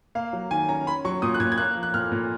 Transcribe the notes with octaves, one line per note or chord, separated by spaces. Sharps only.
A#3 F5
F#3
D#3 G#5
C#4 A#5
C#4 B5
F#3 C#6
A#2 D#6
F#6
A#2 G#6
G#6
A#3 F#6
F3
F#6
A#2 F6
A#2